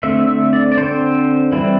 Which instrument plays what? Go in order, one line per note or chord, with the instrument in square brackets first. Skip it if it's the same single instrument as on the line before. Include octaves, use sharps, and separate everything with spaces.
[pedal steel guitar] D3 A3 C4 E5
E5
D5
D5
D3 C4 C5
E3 G3 C4 E4